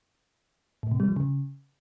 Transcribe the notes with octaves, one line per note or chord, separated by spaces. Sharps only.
A2
C3
G3
F3
C#3